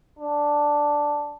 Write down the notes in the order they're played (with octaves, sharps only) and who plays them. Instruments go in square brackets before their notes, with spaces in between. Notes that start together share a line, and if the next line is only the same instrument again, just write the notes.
[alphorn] D4